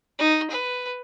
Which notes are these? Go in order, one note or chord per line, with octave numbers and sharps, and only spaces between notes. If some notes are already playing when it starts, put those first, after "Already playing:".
D#4
B4